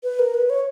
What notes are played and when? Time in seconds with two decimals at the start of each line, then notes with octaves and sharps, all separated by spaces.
0.03 B4
0.19 A#4
0.34 B4
0.50 C#5